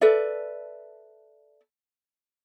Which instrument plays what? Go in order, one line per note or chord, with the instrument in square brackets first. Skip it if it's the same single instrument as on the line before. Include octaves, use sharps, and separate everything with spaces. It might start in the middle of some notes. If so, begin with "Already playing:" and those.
[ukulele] A4 B4 D5 E5